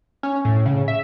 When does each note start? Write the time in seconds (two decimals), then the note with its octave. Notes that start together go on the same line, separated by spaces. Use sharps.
0.23 C#4
0.45 A2
0.66 C#3
0.88 E5